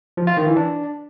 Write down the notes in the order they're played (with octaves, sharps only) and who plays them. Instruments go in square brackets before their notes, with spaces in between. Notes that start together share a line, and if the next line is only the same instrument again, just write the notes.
[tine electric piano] F3
F4
D#3
E3
D4